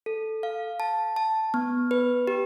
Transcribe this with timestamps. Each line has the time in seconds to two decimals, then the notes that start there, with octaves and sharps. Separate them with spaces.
0.06 A4
0.43 F5
0.80 A5
1.16 A5
1.54 B3
1.91 B4
2.27 G4